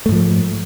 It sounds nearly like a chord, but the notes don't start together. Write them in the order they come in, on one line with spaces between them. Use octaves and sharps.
A3 G#2 F3